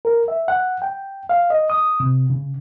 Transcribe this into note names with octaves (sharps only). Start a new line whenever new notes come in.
A#4
E5
F#5
G5
F5
D#5
D#6
C3
C#3